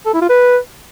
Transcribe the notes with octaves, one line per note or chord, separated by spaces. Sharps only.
A4
E4
F4
B4